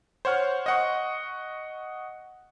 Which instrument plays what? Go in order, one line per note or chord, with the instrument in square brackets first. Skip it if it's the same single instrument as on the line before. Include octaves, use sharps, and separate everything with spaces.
[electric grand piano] C5 C#5 F#5 F6
D#5 F#5 C#6